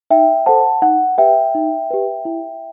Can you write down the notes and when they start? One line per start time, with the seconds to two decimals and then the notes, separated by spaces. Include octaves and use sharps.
0.11 D#4 E5 G5
0.46 A4 C5 F#5 A5
0.82 D#4 F#5
1.18 G4 B4 E5 G5
1.55 D#4
1.90 G4 B4
2.25 E4